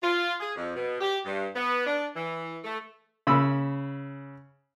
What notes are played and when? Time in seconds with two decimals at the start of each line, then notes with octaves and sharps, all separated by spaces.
0.02 F4
0.40 G#4
0.56 F2
0.75 B2
1.00 G4
1.25 G2
1.55 B3
1.86 D4
2.16 E3
2.64 A3
3.27 C#3 B5 E6